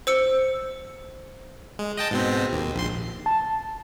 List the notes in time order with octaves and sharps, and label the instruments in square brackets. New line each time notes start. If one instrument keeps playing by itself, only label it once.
[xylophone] C5 E6 C#7
[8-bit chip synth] G#3
D#5 G5 A5
G#2 B2 C4
D#2
A#1 C6
[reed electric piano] A5